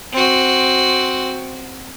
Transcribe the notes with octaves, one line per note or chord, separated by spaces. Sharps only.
C4 F#4